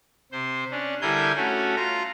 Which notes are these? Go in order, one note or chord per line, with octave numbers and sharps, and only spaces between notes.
C3 C5
C#4 D4
D3 G3 E4 A#4 G#5 G6
A3 C#4 F#4
F4 A#5